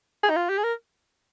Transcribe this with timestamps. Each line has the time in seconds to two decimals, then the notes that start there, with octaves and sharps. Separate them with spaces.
0.23 G#4
0.30 D#4
0.37 F4
0.49 G4
0.58 G#4
0.64 A#4